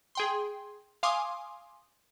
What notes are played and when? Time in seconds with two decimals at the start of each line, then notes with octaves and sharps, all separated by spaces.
0.15 G#4 G5 C6
1.03 F5 G#5 C6 D6 D#6